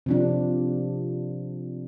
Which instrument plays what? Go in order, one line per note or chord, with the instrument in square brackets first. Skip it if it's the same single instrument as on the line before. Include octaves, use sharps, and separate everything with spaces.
[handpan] C3 F3 D4